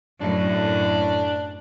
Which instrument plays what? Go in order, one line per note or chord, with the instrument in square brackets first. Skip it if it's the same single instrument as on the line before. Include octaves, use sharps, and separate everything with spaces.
[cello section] F#2 A2 [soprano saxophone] D4